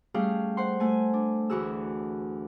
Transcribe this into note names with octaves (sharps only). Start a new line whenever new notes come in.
G3 A3 C#4 G#4 F5 G5
C5 F#5 C6
A3 G#5
D4
D2 E3 F#4 G#4 E6